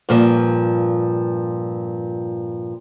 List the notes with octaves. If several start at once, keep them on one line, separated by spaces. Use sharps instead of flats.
G2 A#2 F3